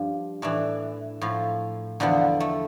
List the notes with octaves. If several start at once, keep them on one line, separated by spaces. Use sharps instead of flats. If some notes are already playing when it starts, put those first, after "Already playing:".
Already playing: G2 F3
A2 E3 D4
A2 F3
E2 D3 F3 B3
A3